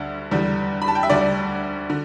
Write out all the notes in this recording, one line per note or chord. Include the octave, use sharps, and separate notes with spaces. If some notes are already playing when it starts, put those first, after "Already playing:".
Already playing: D2 D3 G3
E2 D3 G3
B5
A5
G5
E5
D2 D3 G3 D5
D3